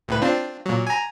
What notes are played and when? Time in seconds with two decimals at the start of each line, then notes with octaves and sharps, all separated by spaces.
0.08 C#2 A2 B4
0.22 C4 D4 F4
0.66 A#2 F#3
0.87 G#5 A#5